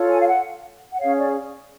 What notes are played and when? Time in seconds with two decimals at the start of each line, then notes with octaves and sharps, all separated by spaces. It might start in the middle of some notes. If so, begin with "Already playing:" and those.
Already playing: F4 A4 C#5
0.09 G#5
0.19 F5
0.28 F#5
0.92 F#5
0.99 C#4 G#4 C#5 F5
1.17 D5